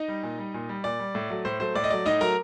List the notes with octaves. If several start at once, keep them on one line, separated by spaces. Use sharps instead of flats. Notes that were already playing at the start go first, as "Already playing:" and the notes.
Already playing: D#4 D#5
G3
A#2
G3
A#2
G3
A#2 D5
G3
A2
F#3 A3
A2 C5
F#3 A3 C5
A2 D5
D#5
F#3 A3 D5
A2 D#4 D#5
F#3 A3 A#4 A#5